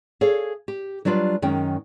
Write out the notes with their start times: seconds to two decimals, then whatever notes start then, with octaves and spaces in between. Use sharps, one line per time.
0.21 G#4 A4 C#5 F5
0.68 G4
1.05 F#3 G3 D4 F4 B4
1.42 F#2 D#3 G#3 C#4 G5